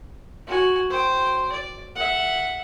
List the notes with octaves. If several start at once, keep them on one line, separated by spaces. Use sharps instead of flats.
F#4 G#5
C5 G5
D5
E5 F#5